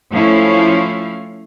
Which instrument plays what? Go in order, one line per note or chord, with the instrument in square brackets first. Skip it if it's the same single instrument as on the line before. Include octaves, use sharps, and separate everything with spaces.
[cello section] F3 A3 C#4 E4 F5